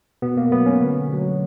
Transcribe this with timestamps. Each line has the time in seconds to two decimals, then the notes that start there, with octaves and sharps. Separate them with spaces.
0.22 B2 B3
0.37 A#3
0.51 F#3 A3 B3
0.66 C#4
0.81 D3
1.11 F#3 A3